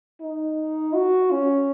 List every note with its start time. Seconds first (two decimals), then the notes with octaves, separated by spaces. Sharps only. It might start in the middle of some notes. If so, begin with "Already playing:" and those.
0.21 D#4
0.94 F#4
1.31 C#4